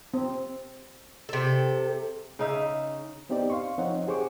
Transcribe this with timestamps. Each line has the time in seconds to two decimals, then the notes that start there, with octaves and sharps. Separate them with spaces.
0.14 C4
1.29 C3 A4
2.39 C#3 D#4 E5
3.29 B3 C4 D#4 G4 C5 D5
3.50 F5 C6 C#6
3.78 F3 C4 D#4 C#5 F#5
4.07 G4 G#4 C5 F#5 C#6 D6